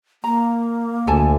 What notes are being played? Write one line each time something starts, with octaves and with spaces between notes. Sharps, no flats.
A#3 A#5
D2 A4 G#5 A5